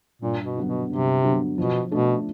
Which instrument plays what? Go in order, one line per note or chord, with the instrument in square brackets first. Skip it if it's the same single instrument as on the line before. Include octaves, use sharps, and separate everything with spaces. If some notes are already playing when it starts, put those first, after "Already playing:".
[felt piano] G2 [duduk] A#2
[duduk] B2
[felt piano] D3 F#3 B3
[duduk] B2
[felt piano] G2 [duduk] C3
[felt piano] D3 F#3 B3
[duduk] B2 [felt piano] F3
[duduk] B2 [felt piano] A3 D4